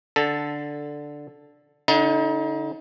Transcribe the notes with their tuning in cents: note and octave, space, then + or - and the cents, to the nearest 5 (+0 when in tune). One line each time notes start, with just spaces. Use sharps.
D3 +0 A4 +0
D3 -15 D#4 +35